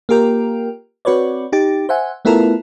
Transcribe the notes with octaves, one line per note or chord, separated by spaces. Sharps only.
A#3 F4 G4 A#4 G5
C4 F#4 B4 C#5 D5
D#4 G4 A6
C5 E5 F#5 G#5
A3 B3 E4 F4 A4 A#4